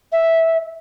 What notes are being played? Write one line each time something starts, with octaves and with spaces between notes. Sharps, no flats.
E5